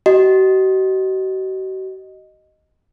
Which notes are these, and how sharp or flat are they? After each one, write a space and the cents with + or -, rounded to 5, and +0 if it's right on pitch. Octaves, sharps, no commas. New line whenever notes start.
F#4 +45 D#5 +0